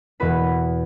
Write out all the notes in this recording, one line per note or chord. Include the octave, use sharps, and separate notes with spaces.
E2 B2 B3 F#4 B4 B5